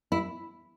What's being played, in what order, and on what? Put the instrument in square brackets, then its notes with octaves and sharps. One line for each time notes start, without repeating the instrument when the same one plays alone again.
[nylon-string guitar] E4